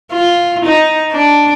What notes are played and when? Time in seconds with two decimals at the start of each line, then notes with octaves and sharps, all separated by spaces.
0.13 F4
0.66 D#4
1.12 D4